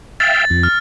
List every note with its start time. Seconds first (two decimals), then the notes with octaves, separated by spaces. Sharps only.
0.20 E5 F5 G5 A6
0.50 F2
0.63 F6